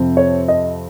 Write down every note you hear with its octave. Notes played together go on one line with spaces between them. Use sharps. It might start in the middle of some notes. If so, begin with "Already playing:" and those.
Already playing: F2 C3 F3 C4
C#5
D#5